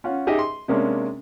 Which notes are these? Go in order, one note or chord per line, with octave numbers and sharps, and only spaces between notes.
C#4 F4 F#5
D#4 G4 G#4 D#5 E5
C6
C3 G#3 A#3 C#4 D4